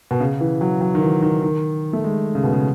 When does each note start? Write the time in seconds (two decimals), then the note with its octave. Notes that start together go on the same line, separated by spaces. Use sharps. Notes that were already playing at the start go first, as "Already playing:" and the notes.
0.11 B2
0.20 C#3
0.41 E3
0.61 F#3
0.81 F#3
0.95 D#3
1.02 E3
1.22 D#3
1.43 D#3
1.93 A3
2.04 G#3
2.35 C#3
2.44 B2
2.52 C#3